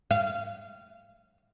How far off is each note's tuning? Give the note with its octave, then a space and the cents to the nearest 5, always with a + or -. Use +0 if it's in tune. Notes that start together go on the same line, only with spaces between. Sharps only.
F5 -20